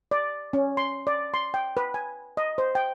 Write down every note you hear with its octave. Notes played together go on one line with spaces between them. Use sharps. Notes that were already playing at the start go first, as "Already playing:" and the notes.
D5
C#4
C6
D5
C6
G5
B4
G#5
D#5
C5
G5